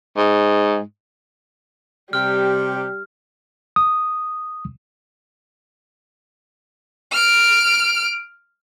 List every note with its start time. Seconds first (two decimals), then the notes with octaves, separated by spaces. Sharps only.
0.17 G#2
2.13 C3 G3 G4 F6
3.76 D#6
7.12 F6 D7